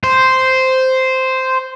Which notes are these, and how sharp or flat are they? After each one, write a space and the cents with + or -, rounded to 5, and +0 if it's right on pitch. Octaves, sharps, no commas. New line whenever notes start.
C5 -5